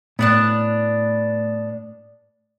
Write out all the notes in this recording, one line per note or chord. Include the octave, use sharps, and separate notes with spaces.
A2 B3 D4 F#6